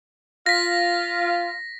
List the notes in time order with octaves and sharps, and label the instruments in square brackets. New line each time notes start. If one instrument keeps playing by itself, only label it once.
[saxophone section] F4 [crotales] A#6 B6